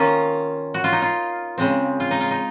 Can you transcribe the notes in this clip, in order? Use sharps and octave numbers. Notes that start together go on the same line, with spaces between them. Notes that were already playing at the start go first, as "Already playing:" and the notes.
Already playing: D#3 A#3 C#4 F4
F#4
F4
D#4
F4
C#3 G#3 C4
F4
D#4
F4
D#4